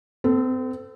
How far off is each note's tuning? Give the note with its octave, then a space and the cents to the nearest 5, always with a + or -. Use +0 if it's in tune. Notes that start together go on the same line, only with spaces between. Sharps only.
C4 -35 A4 +0